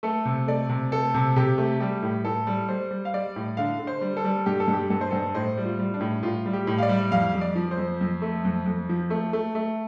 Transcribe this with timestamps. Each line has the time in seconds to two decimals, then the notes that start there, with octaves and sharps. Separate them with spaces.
0.03 A3 A4
0.25 C3
0.48 A3 D5
0.69 C3
0.92 A3 A4
1.14 C3
1.36 C3 G4
1.58 A3
1.80 G3 G4
2.02 A2
2.25 A2 A4
2.47 G3
2.69 G3 C5
2.91 G3
3.05 F5
3.14 G3 D5
3.36 A2
3.57 D3 F5
3.79 D3
3.87 C5
4.01 G3
4.17 A4
4.25 G3
4.46 G2 G4
4.60 A4
4.68 G2
4.73 G4
4.90 G2 A4
5.01 C5
5.11 G2 A4
5.35 A2 C5
5.57 G3
5.65 F4
5.79 G3
5.94 D4
6.01 A2
6.23 A2 F4
6.46 G3
6.53 G4
6.67 A2
6.78 F5
6.83 D5
6.89 G3
7.11 F2 F5
7.34 F2
7.41 D5
7.56 F3
7.71 C5
7.78 F2
8.01 F2
8.22 A3
8.45 F2
8.66 F2
8.89 F3
9.10 A3
9.33 A3
9.55 A3